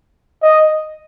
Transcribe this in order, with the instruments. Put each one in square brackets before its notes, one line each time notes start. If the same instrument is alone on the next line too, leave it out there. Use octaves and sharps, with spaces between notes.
[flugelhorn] D#5